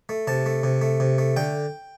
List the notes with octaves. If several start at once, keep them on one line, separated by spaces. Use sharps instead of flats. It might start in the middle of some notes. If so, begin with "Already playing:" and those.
A3
C3 A5
A3
C3
A3
C3
A3
D3 G5